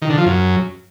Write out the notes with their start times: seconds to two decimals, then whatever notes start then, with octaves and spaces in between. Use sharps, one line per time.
0.02 D#3
0.10 D3
0.18 F3
0.26 F#2